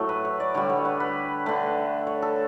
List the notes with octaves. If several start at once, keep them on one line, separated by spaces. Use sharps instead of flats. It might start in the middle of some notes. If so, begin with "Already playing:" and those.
Already playing: A2 F#3 A3
B4
C#5
D5
D3 G3 C#5
C#5
B4
B4
D3 A3 B4
C#5
A4